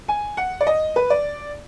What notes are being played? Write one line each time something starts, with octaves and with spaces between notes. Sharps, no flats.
G#5
F#5
D5
D#5
B4
D5